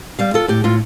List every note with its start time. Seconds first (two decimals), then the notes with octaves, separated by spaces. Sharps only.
0.19 G3 F5
0.34 F4 A4
0.48 A2 G4
0.64 A2 F4